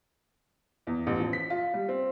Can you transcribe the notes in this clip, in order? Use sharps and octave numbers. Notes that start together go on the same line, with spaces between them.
E2
A1
F3
B6
F4
G3
C4